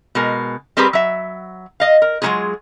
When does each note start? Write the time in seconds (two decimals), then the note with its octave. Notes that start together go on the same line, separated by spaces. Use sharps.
0.15 B2 G#3 A#4
0.77 G3 C4 G4 G#4 A#4 B4
0.93 F#3 E5
1.80 D#5 F5
2.02 A#4
2.22 F#3 G#3 A3 D#4 F4 G#4